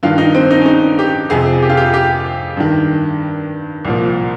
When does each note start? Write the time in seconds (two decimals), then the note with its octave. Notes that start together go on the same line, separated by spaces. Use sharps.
0.03 G2 D#3 F4
0.18 D#4
0.35 C4
0.51 D#4
0.61 C#4
0.66 D#4
0.99 G4
1.30 F2 C3 F3 G#4
1.62 G4
1.69 F4
1.77 G4
1.94 G4
2.57 G2 D#3
3.85 C2 A#2 F3